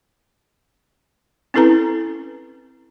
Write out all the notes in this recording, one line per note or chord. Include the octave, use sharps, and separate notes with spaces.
C4 C#4 E4 A4 B4 A#5